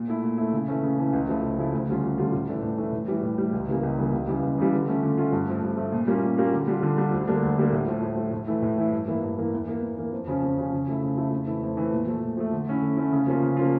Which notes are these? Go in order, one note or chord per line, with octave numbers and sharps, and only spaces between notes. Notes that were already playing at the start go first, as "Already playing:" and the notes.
Already playing: A#2
A3 E4
A#2
A3 E4
C#3
E3 A3 C#4
C#3
E3 A3 C#4
C#2
C#3 F3 A3 E4
C#2
C#3 F3 A3 E4
D2
D3 G3 C#4 F4
D2
D3 G3 C#4 F4
A2
E3 A3 D4
A2
E3 A3 D4
A2
E3 G3
A2
E3 G3
C#2
C#3 E3 G3 A#3
C#2
C#3 E3 G3 A#3
C#2
C#3 E3 G3
C#2
C#3 E3 G3
D3
A3 C#4 F4
D3
A3 C#4 F4
G2
F3 A3
G2
F3 A3
A#2
G3 A#3 C#4 F4
A#2
G3 A#3 C#4 F4
D3
G3 D4 F4
D3
G3 D4 F4
D2
D3 G3 A#3 D4
D2
D3 G3 A#3 D4
A2
F3 A3
A2
F3 A3
A2
E3 A3 E4
A2
E3 A3 E4
G2
E3 A#3 E4
G2
E3 A#3 E4
E2
E3 A#3
E2
E3 A#3
F2
C#3 F3 C#4
F2
C#3 F3 C#4
C#3
F3 A3 E4
C#3
F3 A3 E4
F2
E3 A3 E4
F2
E3 A3 E4
A#2
F3 A3
A#2
F3 A3
D3
A3 C#4 E4
D3
A3 C#4 E4
C#3
F3 A#3 C#4 F4
C#3
F3 A#3 C#4 F4